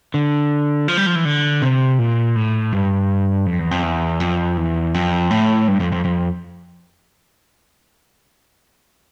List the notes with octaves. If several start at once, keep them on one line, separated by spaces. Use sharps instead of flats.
D3
F3
G3
F3
E3
D3
C3
A#2
A2
G2
F2
E2
F2
E2
F2
E2
F2
A2
G2
F2
F2
F2